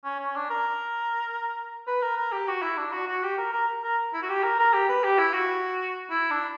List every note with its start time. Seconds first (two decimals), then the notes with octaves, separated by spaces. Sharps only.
0.04 C#4
0.19 C#4
0.35 D4
0.50 A#4
1.87 B4
2.02 A#4
2.17 A#4
2.32 G4
2.47 F#4
2.62 E4
2.77 D4
2.92 F#4
3.07 F#4
3.23 G4
3.38 A#4
3.52 A#4
3.83 A#4
4.13 E4
4.22 F#4
4.29 G4
4.43 A#4
4.59 A#4
4.73 G4
4.89 B4
5.04 G4
5.19 E4
5.34 F#4
6.10 E4
6.30 D4